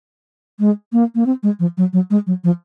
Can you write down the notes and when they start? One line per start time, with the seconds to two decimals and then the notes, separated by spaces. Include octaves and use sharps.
0.60 G#3
0.93 A#3
1.15 A#3
1.26 C4
1.43 G#3
1.60 F3
1.78 F#3
1.93 F#3
2.10 G#3
2.27 F#3
2.44 F3